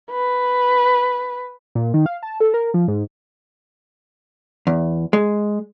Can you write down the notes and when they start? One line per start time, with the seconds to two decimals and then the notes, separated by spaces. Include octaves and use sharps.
0.12 B4
1.75 A#2
1.94 D#3
2.06 F5
2.23 A5
2.40 A4
2.54 A#4
2.74 F3
2.88 G#2
4.67 E2
5.13 G#3